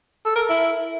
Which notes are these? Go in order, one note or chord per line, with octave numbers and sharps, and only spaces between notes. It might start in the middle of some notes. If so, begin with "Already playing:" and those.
A4
A#4
E4